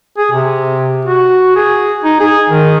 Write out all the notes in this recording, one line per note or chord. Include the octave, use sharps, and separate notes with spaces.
G#4
C3
F#4
G#4
D#4
G#4
D#3